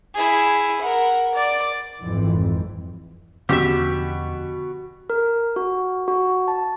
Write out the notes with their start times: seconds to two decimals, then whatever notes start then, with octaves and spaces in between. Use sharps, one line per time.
0.14 E4 G#4
0.81 A#4 F#5
1.34 D5
2.00 G#1 F2 E3
3.49 E2 B2 D3 F3 C#4 G4 E5
5.10 A#4
5.56 F#4
6.08 F#4
6.48 A5